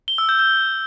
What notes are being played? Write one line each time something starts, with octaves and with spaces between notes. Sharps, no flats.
G7
E6
G6
G6